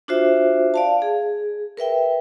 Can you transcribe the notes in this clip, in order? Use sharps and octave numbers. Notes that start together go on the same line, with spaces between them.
D4 F4 F#4 C5 E5
D5 F5 A5
G#4
A#4 B4 E5 G5